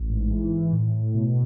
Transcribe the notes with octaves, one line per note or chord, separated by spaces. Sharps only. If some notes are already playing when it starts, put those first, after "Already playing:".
Already playing: A1
G#2
E3
E3
A2
A2
B2